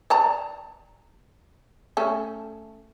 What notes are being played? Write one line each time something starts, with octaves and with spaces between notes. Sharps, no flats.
D5 A5 A#5
A3 C#4 A4